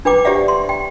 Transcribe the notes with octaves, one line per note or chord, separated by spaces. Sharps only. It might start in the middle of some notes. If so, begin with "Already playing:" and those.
D4 B4 G5 D6
G4 C5 D5 E5 F#5
C6
G5